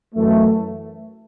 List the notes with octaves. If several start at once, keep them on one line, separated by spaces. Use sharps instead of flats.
F#2 E3 A3